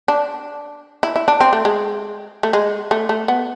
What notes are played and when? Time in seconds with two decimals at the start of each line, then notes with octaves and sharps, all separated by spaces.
0.08 D4
1.03 E4
1.16 E4
1.28 D4
1.41 C4
1.53 A3
1.65 G#3
2.43 A3
2.53 G#3
2.91 A3
3.09 A3
3.28 B3